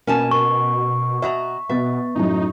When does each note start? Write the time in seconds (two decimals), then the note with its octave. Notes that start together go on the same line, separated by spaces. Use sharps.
0.07 B2 A#3 C#4 G#5 A5
0.31 A#4 C#6
1.22 B2 F#4 E5 A#5
1.69 B2 B3 E5 A6
2.15 F#2 A2 F#3 D#4